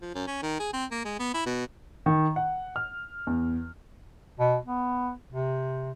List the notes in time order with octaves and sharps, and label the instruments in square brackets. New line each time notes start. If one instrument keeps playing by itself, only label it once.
[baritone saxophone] F3
F#2
C#4
D#3
G#4
C4
A#3
G#3
B3
E4
B2
[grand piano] D#3
F#5
F6
E2
[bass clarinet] B2
B3
C3